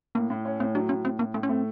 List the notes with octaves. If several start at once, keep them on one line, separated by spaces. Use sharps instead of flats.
A2 A#3
A2
C#4
A2 C4
F#3 D4
A2 C#4
A2 C4
A2 A#3
A2 A3
C#4
A3 C4